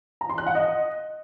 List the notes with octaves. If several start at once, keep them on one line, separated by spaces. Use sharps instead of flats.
A#5
C6
F#6
F#5
D#5